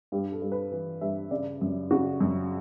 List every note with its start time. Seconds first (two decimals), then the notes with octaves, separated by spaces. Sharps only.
0.12 G2 G4
0.32 A4
0.42 G2
0.52 B4
0.72 E3
1.01 G2 E5
1.31 C#3 D5
1.61 F#2
1.91 C#3 F#4
2.21 F#2